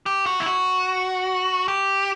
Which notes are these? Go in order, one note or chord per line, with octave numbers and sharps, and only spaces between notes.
G4
F#4
E4
F#4
G4